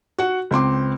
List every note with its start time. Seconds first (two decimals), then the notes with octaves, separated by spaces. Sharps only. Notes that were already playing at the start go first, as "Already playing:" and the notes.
0.18 F#4 F#5
0.51 C#2 C4 C6 D6